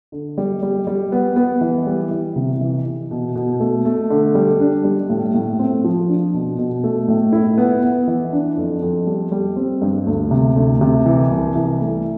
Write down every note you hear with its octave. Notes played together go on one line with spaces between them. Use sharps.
D3
G3
G3
G3
B3
B3
E3
G3
E3
C3
E3
E3
B2
B2
A3
A3
D3
G3
D4
G3
A2
A2
C4
F3
D4
B2
B2
A3
A2
E4
B3
B3
E3
D4
F2
F2
G3
G3
C4
G2
D2
C3
D2
C3
E3
C2
E3
A3